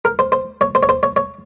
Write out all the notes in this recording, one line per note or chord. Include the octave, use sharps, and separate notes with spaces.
A#4
C5
C5
C#5
C5
C#5
C5
C#5
C#5